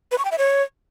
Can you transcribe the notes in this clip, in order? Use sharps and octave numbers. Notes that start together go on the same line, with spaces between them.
B4
C#6
G5
E5
C#5